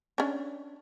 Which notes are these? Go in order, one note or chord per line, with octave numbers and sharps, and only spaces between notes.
C#4 D4